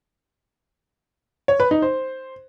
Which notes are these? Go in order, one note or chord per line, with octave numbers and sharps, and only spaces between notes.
C#5
B4
D#4
C5